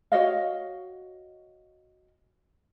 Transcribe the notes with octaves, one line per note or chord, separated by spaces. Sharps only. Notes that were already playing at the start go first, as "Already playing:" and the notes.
F#4 C#5 D#5 F5